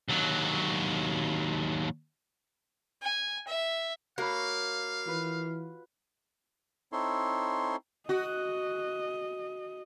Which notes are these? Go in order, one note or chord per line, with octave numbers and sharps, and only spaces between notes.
D#2 F#3
G#5
E5
A#3 F#4 C#5 F5 B5
E3 F4 B4
C4 D#4 E4 A4 C#5 C6
F#4 D#5